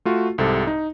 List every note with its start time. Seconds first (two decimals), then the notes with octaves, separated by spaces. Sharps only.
0.05 A3 F4 F#4
0.38 C2 G#2 C3 A4
0.67 D#4